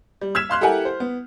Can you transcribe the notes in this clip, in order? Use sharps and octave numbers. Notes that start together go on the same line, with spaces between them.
G3
E6 F6 G#6 B6 E7
F5 C6 F6 F#6
E4 G4 A4 A#4 F#5 G#5
C5
B3